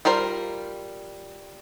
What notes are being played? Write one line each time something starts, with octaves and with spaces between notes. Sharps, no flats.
G3 F4 A#4 C5